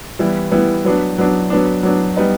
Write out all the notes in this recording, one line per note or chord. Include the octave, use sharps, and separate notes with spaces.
E3 G3 B3 E4
E3 G3 B3 E4
F#3 B3 D4
F#3 B3 D4
F#3 B3 D4
F#3 B3 D4
G3 B3 D#4